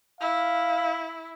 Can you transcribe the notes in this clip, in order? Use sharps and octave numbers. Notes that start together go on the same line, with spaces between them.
E4 F5